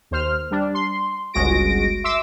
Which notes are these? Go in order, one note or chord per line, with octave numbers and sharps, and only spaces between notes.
D#2 C5 F6
G3 D4
C6
G1 C#2 G#3 F#4 A#6 D7
E5 C6 D6 E6